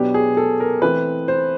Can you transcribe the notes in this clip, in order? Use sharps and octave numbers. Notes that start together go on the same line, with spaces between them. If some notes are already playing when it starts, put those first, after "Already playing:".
Already playing: B2 F#3 B3 D4 G4
G#4
A4
A#4
E3 A3 C4 B4
C5